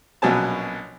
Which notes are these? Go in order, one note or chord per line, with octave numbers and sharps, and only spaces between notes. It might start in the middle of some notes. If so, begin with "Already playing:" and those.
A#1 B2 F#3 C#4 G#5 A5